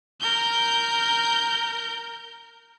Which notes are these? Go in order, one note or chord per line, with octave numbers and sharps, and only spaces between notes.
A#4 G6